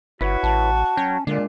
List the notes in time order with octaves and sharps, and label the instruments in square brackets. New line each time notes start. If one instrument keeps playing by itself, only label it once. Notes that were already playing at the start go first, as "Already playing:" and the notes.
[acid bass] G1 [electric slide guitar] E4 B4 C#5 [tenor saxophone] F#4
[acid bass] A1 [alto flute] A5
[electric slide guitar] F#3 G5 [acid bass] C#4
[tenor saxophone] A#2 [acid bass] D3 [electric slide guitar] G#3 D4